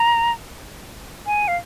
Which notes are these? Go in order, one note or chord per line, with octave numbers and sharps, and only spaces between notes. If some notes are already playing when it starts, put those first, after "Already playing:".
Already playing: A#5
G#5
F5